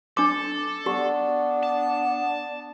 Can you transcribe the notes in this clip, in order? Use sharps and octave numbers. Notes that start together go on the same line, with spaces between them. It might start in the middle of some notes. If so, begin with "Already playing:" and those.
D4 A4 D6
B3 D4 G4
A5